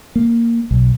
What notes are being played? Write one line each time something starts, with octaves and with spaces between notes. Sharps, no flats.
A#3
B1